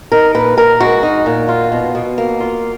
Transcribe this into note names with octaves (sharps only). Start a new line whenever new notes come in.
D#4 A#4
A#2 B4
A#2 A#4
G#3 F#4
D#4
A#2
F4
B2
B2
A#3
F4